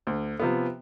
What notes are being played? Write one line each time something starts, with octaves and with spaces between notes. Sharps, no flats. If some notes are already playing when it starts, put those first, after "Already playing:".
D2
C3 F3 B3